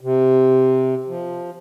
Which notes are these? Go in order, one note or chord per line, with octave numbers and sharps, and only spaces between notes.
C3
F3